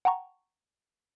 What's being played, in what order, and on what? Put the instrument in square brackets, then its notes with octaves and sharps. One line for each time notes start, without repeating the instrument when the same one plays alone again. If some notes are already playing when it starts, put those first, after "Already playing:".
[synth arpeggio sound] F#5 G5 A5 A#5 C#6